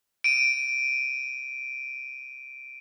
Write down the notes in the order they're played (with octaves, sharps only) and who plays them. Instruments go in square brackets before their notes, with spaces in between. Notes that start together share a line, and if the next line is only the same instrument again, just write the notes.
[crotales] D7 D#7